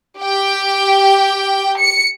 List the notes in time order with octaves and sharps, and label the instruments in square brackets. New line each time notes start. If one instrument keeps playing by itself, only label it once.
[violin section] G4 G5
C#7